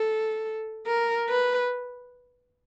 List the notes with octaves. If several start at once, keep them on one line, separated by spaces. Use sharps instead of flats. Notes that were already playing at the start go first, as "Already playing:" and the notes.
Already playing: A4
A#4
B4